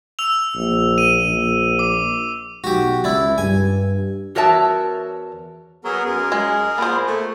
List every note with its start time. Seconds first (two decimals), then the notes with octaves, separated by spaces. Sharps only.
0.19 E6 F7
0.56 A#1
0.98 D#7
1.28 A#1
1.79 D6
2.64 B1 F#4 G4
3.04 C#2 D4 E4
3.38 G2 G#5
4.35 E2 F#4 A#4 C#5 E5 A5
5.85 F#3 B3 G#4 A#4
6.05 F#2 G#4 A#4
6.32 G#3
6.78 A#2 B3 C5
7.07 A3